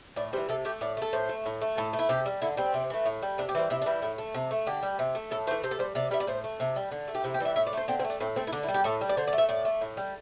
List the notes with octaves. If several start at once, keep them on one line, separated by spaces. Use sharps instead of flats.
A2 D5
E3 G3 C5
C3 A4
A3 G4
A2 D5
A3 A4
A2 C5
A3
A2
A3
A2 A4
A3
E4
C3 G4
G3
D3 E4
G3 C4
C3
E3 A3
A2
G3
C3 D4
G4
E3 G3 C4
C3 E4
D4
E3 G3 E4
A2
A3
C3
A3
D3 G4
G3
C3
A3
A2 A4
E3 A3 C5
C3 C5
A4
G3 C5
C3 D5
G3 E5
D5
A2 C5
A3
C3
G3
D3
A3
G4
C3 E4
G4
E3 G3 E5
A2 E5
D5
A3 C5
D3 C4
C4
A3
D4
A2 C4
A3 C4
E4
D3 D4
E4
G3
G4
A2 A4
G3
D5
D3 C5
D5
A3
E5
A2 D5
A3
A2
G3